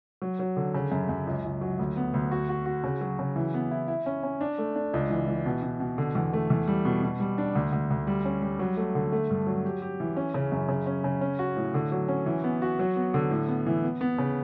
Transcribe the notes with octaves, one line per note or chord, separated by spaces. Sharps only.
F#3
F#3
D3
C#3
F#2
F#2
C#2
C#2
F#3
D2
B3
D2
F#4
F#4
F#4
C#3
F#3
C#3
E3
B3
E4
E4
C#4
C#4
D4
A3
D4
C#2
E3
E3
B2
B2
B2
D3
E2
A3
E2
G3
B2
B2
G3
D4
D2
D2
D2
G3
C#4
G3
F#3
A3
D3
A3
G2
F#3
G4
G4
E3
C#4
C#3
F#2
C#3
C#4
C#3
C#4
F#4
A2
D3
F#3
C#4
E3
B3
F#4
F#3
B3
D3
A2
B3
E3
B3
B3
C#3